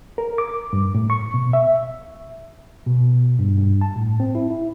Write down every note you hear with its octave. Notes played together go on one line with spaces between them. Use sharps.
A#4
D6
G2
A2
C#6
B2
E5
B2
G2
G2
A5
A2
C4
E4
E4